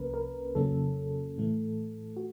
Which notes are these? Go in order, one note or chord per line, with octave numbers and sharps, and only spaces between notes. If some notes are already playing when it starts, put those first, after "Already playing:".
Already playing: C2 C3 F3 A#3 C#4 A#4 B4
A#4
F2 C#3 F#3 A#3 C#4 A4
A2 E3 A3
F#4